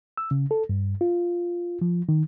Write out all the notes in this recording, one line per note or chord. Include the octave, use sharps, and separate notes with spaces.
E6
C#3
A4
G2
F4
F3
D#3